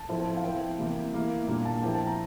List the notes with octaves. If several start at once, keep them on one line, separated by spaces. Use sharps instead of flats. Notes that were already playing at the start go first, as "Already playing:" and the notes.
Already playing: A5
A2 F3 C4 E4
F5
F3 C4 E4 G5
C3 E3 A#3
E3 A#3 E4
A#2 G3 A#3 D4
A5
F3 C4 E4 G5
A5
A#5